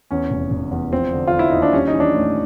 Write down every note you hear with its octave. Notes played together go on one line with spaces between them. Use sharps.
E2 C#4
F1
F1
E2
F3 C4
D3
F4
D3
E4
D#2 D#4
D4
G3 C#4
D#4
E3
D4
A2